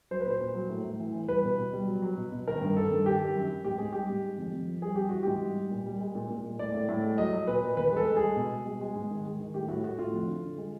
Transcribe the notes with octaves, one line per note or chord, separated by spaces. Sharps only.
F#3 C5
B4
A#2 C5
A#2
F#3
A2
A2
E3
E3
G3 B4
B2
B2
G3
F#3
F#3
B2
B2
D#3 A#4
G2
D#3 A4
G2
D#3 G4
D#3
F#2
F#2
G#2 G4
G#2 G#4
G3 G4
G#2
G#3
F2
F2
F3
G3 G#4
G3 G4
E3 F#4
G#2 G4
G3
G3
A#2
G3
G#3
A#2
A#2
G#3
A2 D5
A2
A2
G#3
F#3 D#5
F#3
A#2 B4
A#2
E2 B4
G#3 A4
G#3
G#4
G#3
B2
B2
G#3
G#3
G#2
D#3
G#3
D#3
A2 G4
A2 F#4
A2 F#4
A2 F4
F2
D3
D3
G#3